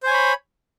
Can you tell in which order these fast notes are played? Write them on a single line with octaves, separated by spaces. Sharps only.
C5 G#5 C#5 B5